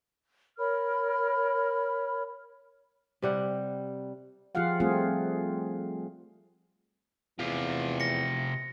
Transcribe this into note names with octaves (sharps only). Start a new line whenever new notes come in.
A#4 C#5 B5 F6
C3 G3 F#5
F3 F4 G4 G#4 F5 F#5
G3 A3 C4 F4 G#4
E2 C3 F4
A#6 C#7